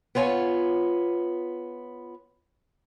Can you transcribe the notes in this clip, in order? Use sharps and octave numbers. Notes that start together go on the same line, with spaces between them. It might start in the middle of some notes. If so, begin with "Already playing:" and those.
B3 F4 C#5 G#5